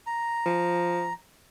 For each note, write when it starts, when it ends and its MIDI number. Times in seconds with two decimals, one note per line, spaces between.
0.06 1.13 82
0.46 1.11 53